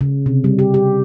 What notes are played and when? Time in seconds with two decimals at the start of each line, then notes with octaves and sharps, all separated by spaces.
0.01 C#3
0.26 C3
0.44 G3
0.59 G4
0.74 G4